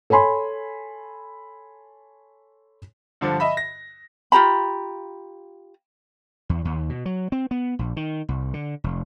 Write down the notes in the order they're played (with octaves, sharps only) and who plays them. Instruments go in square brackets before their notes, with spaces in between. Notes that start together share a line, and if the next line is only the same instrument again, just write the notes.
[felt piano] A4 C#5 G#5 B5 C6
[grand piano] G2 D3 F3
D#5 E5 B5
A#6
[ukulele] F4 G4 A#5 B5
[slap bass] E2
D#2
B2
F#3
C4
B3
A#1
D#3
C2
D3
F1